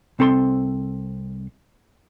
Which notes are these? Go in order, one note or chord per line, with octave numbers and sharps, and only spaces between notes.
C2 C4 A4 B5 C6